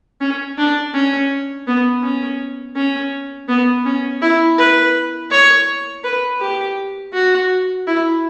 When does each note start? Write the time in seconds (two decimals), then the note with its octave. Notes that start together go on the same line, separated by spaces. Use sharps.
0.21 C#4
0.57 D4
0.94 C#4
1.67 B3
2.03 C#4
2.76 C#4
3.49 B3
3.85 C#4
4.22 E4
4.58 B4
5.31 C#5
6.04 B4
6.41 G4
7.14 F#4
7.87 E4